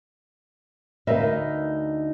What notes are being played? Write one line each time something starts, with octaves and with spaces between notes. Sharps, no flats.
D2 D#4 A#4 B4 E5 F5